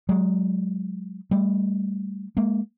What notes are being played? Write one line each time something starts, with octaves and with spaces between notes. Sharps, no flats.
F#3 G#3
G3 A3
G#3 A#3